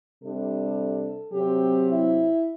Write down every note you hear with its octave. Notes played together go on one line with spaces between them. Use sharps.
C3 G3 D4 A4
C3 F#3 C4 G4
E4